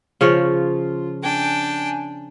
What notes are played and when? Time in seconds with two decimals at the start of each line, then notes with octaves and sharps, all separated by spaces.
0.21 C#3 F3 F4 C#5
1.23 D4 G5 G#5